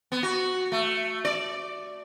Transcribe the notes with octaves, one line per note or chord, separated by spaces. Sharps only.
B3
F#4
A3
D5